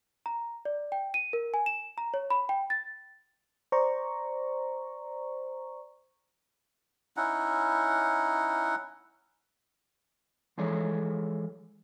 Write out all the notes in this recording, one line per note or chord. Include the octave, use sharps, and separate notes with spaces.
A#5
D5
G5
D#7
A#4
G#5
E7
A#5
C#5
B5
G5
A6
C5 D5 A#5 C#6
C#4 D#4 E4 F#5
E3 F3 G#3 G#4 A4 C#5